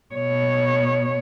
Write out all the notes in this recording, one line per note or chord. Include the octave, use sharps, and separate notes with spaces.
B2 C#5